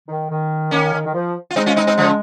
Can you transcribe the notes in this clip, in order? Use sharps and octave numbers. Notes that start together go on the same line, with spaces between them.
D#3
D#3
D#3 A#3 C#4
D#3
D#3
F3
F4
G#3 C4 D#4
C#4 F4
C4 D#4
C4 D#4
C#3 F3